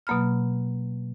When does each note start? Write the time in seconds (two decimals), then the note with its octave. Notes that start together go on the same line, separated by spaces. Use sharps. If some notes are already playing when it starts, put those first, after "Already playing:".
0.07 B2 F#3 A#3 B5 F6